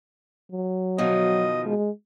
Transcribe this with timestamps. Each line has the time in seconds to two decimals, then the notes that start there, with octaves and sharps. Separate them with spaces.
0.52 F#3
0.98 B2 D#3 F3 D#5
1.66 G#3